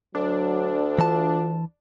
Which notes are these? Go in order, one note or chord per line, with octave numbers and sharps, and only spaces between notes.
D2 F#3 D4
E3 F4 A5